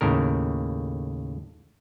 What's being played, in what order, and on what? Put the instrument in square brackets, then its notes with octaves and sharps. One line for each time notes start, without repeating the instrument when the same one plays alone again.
[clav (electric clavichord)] D#2 A2 C#3 A#4